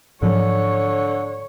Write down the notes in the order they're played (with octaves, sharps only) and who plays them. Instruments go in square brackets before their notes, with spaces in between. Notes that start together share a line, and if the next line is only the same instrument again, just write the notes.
[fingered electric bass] G#2 F3 F#3 [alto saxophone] D3 [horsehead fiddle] C#5